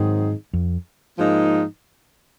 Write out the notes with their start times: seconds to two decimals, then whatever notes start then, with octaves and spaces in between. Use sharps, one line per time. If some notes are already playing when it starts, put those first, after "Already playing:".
Already playing: G#2 D#3 F#3 C4 D#4 G#4
0.53 F2
1.18 G#2 F3 A#3 D#4